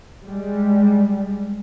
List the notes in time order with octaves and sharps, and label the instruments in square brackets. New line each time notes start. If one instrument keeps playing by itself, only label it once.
[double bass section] G3 G#3